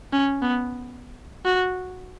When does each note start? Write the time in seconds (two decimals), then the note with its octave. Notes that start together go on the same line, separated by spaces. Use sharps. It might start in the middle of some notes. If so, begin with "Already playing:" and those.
0.13 C#4
0.42 B3
1.45 F#4